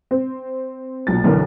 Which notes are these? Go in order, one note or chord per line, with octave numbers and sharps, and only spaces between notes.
C4
B1 A#2 A6
B1 F#2 D3 E3 A#4